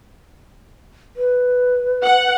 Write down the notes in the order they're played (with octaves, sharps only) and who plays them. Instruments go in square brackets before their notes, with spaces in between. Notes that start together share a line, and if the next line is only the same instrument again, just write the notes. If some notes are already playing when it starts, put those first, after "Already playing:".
[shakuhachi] B4
[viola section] F#5